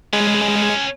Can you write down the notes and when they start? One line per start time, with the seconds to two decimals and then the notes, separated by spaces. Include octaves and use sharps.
0.13 G#3 C#4 B4